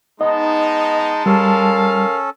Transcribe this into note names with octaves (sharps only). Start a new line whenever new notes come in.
G#3 B3 D#4 D#5 A5
G3 C#4 A4 A#4 F5